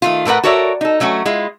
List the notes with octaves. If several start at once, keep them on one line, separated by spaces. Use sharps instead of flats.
D#3 A3 F4
A2 A3 A#4 B4 F#5
F#4 A4 A#4 C#5 D5 E5
D#4 A4
F#3 A3 C#4 F#4
G#3 E4 F4